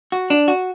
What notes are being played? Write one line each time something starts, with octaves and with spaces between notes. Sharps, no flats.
F#4
D4
F#4